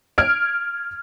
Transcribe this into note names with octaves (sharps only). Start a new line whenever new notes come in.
F6 G#6 D7